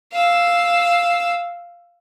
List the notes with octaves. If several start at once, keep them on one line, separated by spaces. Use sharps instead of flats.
F5 E6